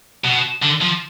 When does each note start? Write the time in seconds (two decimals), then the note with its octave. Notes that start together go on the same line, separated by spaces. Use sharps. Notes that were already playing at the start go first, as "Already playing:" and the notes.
0.24 B2
0.62 D3
0.81 F3